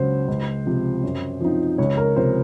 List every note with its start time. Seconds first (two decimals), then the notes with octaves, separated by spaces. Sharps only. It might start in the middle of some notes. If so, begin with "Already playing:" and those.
Already playing: C#2 C#3 F#3 C5
0.28 C#2
0.66 C3 F3
1.03 F#2
1.41 F3 C4 D#4
1.78 C#2 C#5
1.97 A#4
2.16 C3 F3 C5